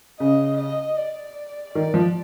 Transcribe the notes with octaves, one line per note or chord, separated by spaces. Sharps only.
C#3 D#5
D#5
D5
D#3 D5
F3